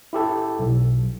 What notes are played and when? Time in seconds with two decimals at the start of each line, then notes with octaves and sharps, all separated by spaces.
0.13 E4 G4 A4
0.59 B1